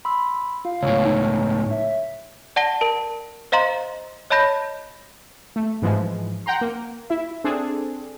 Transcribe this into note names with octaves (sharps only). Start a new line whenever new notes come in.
B5 C6 E6
F4 F5
C#2 A2 C#5
D#4
E5
D5 F#5 A5 A#6 G7
A#4 A5 D7
C5 D#5 F5 A#5 C6
C#5 D#5 A5 B5 G6 A#6
A3
G#2 E3 F3 G#3
F#5 G5 A#5 C6
A#3
E4 E5
C4 D4 G#4 A4